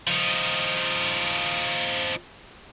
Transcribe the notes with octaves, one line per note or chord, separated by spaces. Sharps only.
F3 D#4